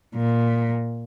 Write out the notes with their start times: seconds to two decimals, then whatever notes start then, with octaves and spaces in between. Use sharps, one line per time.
0.16 A#2